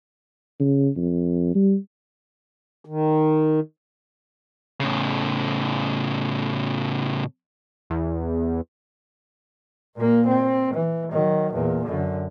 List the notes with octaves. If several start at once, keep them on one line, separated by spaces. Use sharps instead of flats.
C#3
F2
G3
D#3
A2 C#3
E2
A#2 A#3
C4
E3
D#3 F#3
E2 A#2
F#2 D3